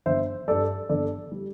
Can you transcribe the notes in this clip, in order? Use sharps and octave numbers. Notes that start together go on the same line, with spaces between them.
G1 C5 E5
G2 G3 A4 D5
G1 A4 D5
G3